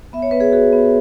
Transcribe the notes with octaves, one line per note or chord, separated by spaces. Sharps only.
B3 E5
C#5
B3 B4
G#4 C#5
F#4 G#4
B3